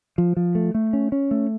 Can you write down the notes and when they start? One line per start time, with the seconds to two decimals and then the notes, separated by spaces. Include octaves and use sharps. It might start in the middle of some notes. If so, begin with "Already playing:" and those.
0.18 F3
0.37 F3
0.55 A3
0.74 A3
0.93 C#4
1.12 C#4
1.31 A3